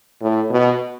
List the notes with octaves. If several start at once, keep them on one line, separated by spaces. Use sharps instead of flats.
A2
B2